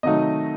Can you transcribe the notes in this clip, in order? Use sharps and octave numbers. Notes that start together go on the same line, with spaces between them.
C3 D#3 F#3 A3 D#4 D#5